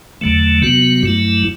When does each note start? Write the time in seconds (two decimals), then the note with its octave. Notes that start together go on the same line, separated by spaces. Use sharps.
0.21 E2 D3 F#3 A3
0.62 C3 F#3 B3 F#4
1.03 G2 F#3 A3 E4